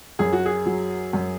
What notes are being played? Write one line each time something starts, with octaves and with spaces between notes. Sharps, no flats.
F#2 G#4
F#4
G#4
F#3
F#2